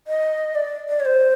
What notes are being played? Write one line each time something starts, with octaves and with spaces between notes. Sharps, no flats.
D#5
D5
D5
C#5
C5